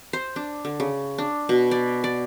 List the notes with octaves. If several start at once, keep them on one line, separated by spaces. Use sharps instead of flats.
C5
D4
D3
C#3
D4
B2
D5
D5